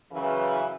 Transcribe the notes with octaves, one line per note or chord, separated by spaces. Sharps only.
F#2 C#3 E3